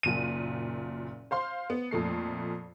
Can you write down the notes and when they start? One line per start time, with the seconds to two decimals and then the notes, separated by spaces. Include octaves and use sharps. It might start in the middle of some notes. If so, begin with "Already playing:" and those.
0.03 F#1 A#2 D#7
1.31 C5 F5 C6
1.70 B3
1.91 F2 A#2 A3 C7